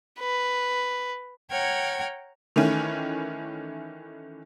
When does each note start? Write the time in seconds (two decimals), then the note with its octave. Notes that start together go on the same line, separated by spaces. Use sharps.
0.20 B4
1.51 C#5 F#5 G5 A#5 F6 G#6
2.56 D#3 E3 A3 C#4